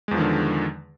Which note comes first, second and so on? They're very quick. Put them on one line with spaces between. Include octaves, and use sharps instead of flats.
G#3 E2 F3 D#3 D3